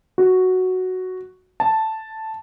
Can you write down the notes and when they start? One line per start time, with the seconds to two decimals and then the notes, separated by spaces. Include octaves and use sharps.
0.18 F#4
1.60 A5